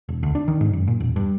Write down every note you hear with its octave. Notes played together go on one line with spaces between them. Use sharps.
E1
D2
D4
D#3
G#2
F#2
A#2
E1
G2